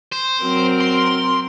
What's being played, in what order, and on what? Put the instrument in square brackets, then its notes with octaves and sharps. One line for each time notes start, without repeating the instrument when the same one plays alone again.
[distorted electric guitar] C5
[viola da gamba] F#3 C4 A#4
[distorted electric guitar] C6